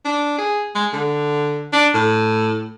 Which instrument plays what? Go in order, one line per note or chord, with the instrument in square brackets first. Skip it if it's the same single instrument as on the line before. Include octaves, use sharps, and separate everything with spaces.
[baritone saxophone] D4
G#4
G#3
D3
D4
A2